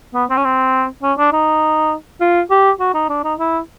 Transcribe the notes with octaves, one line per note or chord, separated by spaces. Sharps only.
B3
C4
C#4
C4
C#4
D4
D#4
F4
G4
F#4
D#4
D4
D#4
E4